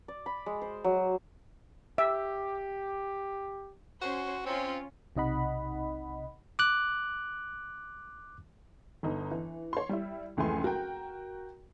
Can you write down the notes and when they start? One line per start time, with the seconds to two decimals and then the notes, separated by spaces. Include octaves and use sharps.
0.08 D5
0.26 B5
0.46 G#3
0.61 C5
0.84 F#3
1.98 G4 E5
4.01 C#4 F#4 C5
4.46 C4 C#4 F4
5.16 B1 C3 D#4 D#5 F#5 B5
6.59 D6 F#6
9.03 G1 D#4
9.31 E3
9.73 C#5 C6
9.89 G3 E4
10.37 F1 C#2 E3 A3 G#5 C6
10.64 F#4 A#4 G5